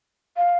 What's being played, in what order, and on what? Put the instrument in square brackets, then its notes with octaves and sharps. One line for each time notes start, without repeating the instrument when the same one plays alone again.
[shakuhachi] F5